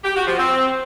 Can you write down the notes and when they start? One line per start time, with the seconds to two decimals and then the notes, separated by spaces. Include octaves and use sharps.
0.04 G4
0.15 F#4
0.27 F3
0.38 C4